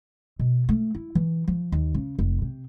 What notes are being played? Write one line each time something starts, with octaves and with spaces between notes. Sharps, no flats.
B2
A3
E4
E3
F3
D#2
C#3
F1
C3